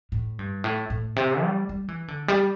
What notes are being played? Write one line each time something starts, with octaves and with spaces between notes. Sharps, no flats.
A2
G2
A2
A2
C3
G3
G3
E3
D3
G3